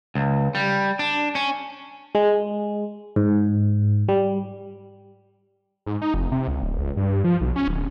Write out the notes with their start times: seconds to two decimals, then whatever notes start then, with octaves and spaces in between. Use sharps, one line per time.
0.15 C#2
0.55 G3
0.99 D4
1.35 C#4
2.15 G#3
3.16 G#2
4.09 G3
5.86 G#2
6.02 D#4
6.14 F1
6.32 C3
6.48 C#2
6.63 D1
6.78 C#2
6.97 G2
7.24 F3
7.41 B1
7.56 C#4
7.68 D1